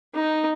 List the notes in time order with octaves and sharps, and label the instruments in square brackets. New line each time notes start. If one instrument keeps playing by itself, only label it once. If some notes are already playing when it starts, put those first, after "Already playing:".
[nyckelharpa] D#4